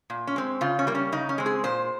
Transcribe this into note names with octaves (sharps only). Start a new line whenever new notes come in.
A#2
C#4
G#3 C4
C#3 F4
C#4
G3 A#3
C#4
C#3 D#4
C#4
G#3 C4
G#4
A#2 C5